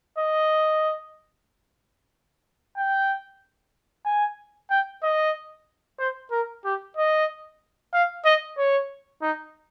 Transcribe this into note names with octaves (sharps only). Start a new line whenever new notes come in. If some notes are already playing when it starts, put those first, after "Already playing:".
D#5
G5
G#5
G5
D#5
C5
A#4
G4
D#5
F5
D#5
C#5
D#4